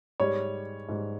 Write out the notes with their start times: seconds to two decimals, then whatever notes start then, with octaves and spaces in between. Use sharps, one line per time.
0.20 G#2 G3 C#5
0.89 G#2 G3